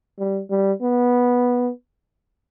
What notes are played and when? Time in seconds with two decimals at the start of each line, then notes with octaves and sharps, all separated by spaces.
0.19 G3
0.50 G3
0.82 B3